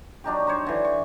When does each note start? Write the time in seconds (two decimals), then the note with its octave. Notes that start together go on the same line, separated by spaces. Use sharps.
0.24 F#3 D4 D#4 G4
0.47 D#4 C5 C#5
0.67 D3 E3
0.85 C#6